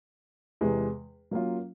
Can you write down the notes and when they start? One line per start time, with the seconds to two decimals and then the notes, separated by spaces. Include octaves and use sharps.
0.61 E2 C3 E3 G#3
1.31 F#3 A#3 C#4 F4